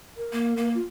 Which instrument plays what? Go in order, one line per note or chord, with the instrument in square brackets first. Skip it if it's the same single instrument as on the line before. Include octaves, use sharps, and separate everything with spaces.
[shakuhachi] A#4
[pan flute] A#3
A#3
[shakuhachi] F4